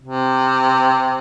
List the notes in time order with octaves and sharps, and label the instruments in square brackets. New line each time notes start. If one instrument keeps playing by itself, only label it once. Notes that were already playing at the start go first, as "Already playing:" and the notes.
[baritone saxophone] C3